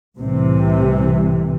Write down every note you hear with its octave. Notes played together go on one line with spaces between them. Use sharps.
C2 A2 C3 E3 G3